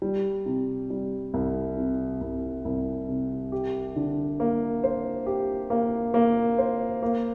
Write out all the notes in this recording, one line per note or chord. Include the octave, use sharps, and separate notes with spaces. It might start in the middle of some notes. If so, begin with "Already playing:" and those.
G3
C3
G3
C2
C3
C2
C2
C3
G4
D3
A#3
C5
G4
A#3
A#3
C5
A#3